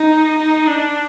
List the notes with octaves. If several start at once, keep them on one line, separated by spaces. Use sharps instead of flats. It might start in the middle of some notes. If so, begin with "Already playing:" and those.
Already playing: D#4
D#4
D4